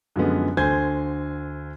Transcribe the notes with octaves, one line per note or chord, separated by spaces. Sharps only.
F#2 D3 F3 G#3 B3
D2 D3 C5 G#5 G6 G#6